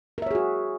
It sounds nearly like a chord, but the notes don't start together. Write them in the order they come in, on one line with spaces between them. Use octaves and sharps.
A#4 E5 C#5 G#4 F#4